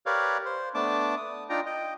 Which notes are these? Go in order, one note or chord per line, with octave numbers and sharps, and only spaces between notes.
G4 A#4 B4 C#5 D5 F5
C5
A3 B3 D4 A5 D6
D#6
D4 D#4 F4 G5 A#5
D#5 G5